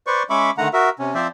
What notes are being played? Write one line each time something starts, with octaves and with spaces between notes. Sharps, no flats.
B4 C5 D5 C#6
G#3 C#4 E5 B5 C#6 D6
D3 D#3 A3 F#5 A#5
F#4 A#4 E5
C3 C#4
F3 C4 C5 D5 E5